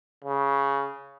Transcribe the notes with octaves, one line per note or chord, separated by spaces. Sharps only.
C#3